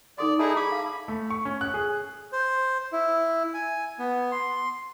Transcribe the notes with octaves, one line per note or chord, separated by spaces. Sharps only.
D#4 A4 D5 C6
D#4 E4 G#4 A4 A5
G#4 B5 D6
F5 A5
A3
C#6
C#4
F#6
G#4
C5
E4
G#5
B3
C6